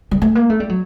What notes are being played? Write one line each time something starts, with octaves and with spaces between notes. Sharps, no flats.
G3
A3
A#3
A3
G3
F#3